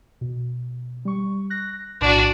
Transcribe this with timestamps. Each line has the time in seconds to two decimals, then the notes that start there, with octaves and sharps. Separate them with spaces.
0.21 B2
1.05 G3 C#6
1.50 F#6 A#6
2.01 B1 A2 D4 F#4